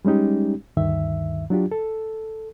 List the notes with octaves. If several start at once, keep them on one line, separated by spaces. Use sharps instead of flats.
G3 G#3 C#4 D#4 G4
D2 G2 D#3 E5
F#3 D4 F4 G4
A4